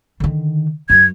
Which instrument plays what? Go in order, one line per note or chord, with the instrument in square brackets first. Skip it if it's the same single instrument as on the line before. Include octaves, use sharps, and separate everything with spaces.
[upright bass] D3 D#3
[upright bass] F#2 [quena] G#6